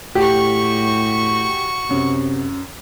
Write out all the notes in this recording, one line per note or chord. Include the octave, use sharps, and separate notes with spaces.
A2 F#4 G4 C#6
F#2 C3